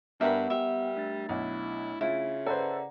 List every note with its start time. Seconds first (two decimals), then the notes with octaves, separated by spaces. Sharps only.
0.21 G2 B3 A#4 E5 F#5 G5 B5
0.50 G3 E5
0.95 A3 D4 A6
1.29 B1 E4 F#5
2.01 C#3 E4 F4
2.46 A4 B4 C5 D5 F#5 A#5